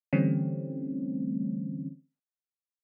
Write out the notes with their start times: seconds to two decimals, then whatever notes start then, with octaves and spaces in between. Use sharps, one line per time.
0.13 D3 E3 G3 A3 C4 C#4